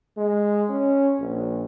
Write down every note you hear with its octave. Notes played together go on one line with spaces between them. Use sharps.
G#3
C#4
A#1